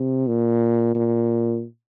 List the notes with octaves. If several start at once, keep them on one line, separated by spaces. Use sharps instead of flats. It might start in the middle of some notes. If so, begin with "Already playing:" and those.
Already playing: C3
A#2
A#2